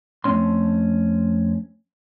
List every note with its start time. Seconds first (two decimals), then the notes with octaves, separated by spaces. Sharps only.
0.24 F2 A3 C4 C#4 C6